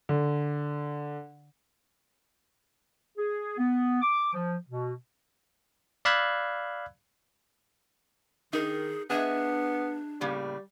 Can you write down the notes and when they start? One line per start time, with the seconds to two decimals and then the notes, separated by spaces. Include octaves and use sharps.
0.09 D3
3.18 G#4
3.58 B3
4.02 D6
4.34 F3
4.68 B2
6.05 D5 F5 B5 E6 F#6 G#6
8.53 D#3 D#4 G#4 A#4
9.10 B3 D4 G#4 D#5 E5
10.21 A2 C#3 G3 A#3